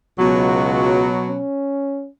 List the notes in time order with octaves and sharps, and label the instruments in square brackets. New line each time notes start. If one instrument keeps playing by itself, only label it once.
[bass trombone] C#2 [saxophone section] B2 F#3
[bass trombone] C#4